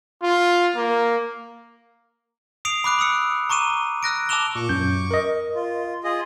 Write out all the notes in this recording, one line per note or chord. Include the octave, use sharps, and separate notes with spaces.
F4
A#3
D#6 C7 D7 F7
B5 D6 F#6 D7
B5 D#6 E6 C#7
A#5 C#6 D6 D#7 E7
E6 F#6 A#6 D7
A5 D6 E6 E7 F7 G7
A#2 C#6 D6
F#2 G6
A#4 D#5
F4
F4 G#4 D#5